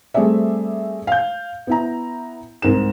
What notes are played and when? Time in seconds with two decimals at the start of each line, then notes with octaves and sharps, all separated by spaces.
0.14 G3 A3 C4 G#4 D5 E5
1.07 F5 G6
1.67 B3 E4 A#5
2.62 C2 G#2 A#4 E7